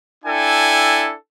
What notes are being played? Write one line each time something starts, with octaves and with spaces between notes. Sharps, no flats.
D4 E4 A4 G5 G#5